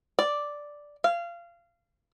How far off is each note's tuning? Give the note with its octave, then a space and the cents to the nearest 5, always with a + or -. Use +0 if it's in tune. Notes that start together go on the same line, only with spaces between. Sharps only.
D5 +0
F5 -25